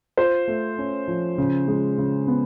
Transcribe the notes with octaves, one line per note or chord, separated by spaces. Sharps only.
F4 C5
A3
C#4
F3
C#3
G#3
C#3
B3